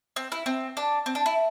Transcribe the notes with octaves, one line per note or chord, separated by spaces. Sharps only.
C4
E4
C4
D4
C4
D4
E4